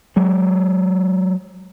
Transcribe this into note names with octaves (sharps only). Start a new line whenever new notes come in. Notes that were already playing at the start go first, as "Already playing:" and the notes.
F#3 G#3